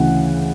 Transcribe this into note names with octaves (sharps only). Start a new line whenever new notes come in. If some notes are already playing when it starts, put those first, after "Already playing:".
Already playing: D2 C#3 E3 F#5